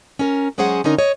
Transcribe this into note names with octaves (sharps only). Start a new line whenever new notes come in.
C#4 A#4
F#3 G#3 C#4 G#4 C5 F#5
D3 C#4 D#4 A#4
C#5 D#5